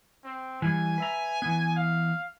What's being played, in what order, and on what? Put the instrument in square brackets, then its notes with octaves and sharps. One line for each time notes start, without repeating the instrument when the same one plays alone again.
[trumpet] C4
[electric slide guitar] E3 G3 [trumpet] G#5
[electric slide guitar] B4 E5 A#5
E3 B3
[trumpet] F5